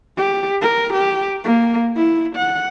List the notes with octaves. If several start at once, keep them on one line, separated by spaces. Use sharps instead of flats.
G4
A#4
G4
A#3
E4
F#5